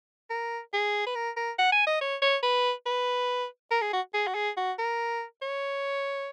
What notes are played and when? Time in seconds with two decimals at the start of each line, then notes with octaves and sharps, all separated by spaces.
0.30 A#4
0.73 G#4
1.06 B4
1.15 A#4
1.36 A#4
1.59 F#5
1.72 G#5
1.87 D#5
2.01 C#5
2.22 C#5
2.43 B4
2.86 B4
3.71 A#4
3.81 G#4
3.93 F#4
4.14 G#4
4.27 F#4
4.35 G#4
4.57 F#4
4.78 A#4
5.42 C#5